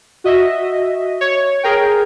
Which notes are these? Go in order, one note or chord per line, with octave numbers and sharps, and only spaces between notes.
F#4 D#5 E5
C#5
G#4 A#4 G5